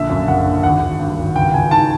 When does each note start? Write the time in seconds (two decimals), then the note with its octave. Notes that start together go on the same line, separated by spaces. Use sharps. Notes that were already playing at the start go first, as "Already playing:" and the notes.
Already playing: A#1 D3 E5
0.10 F#2
0.28 F#1 F#5
0.46 D3
0.63 G#1 F#5
0.82 G#1
0.99 G2
1.17 G#1
1.36 C#2 G5
1.54 C#2 G#5
1.71 D#3 A5